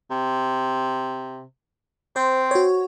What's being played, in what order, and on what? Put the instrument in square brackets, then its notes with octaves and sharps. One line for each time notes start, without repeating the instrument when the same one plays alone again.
[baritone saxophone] C3
[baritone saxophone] C4 [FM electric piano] C5
[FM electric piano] F#4 C#5